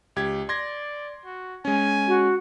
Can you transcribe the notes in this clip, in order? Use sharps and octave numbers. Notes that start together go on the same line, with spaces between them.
C#2 G4 G#6
D5 C6 G#6 A#6
F#4
G#3 C#4 G#5
F#4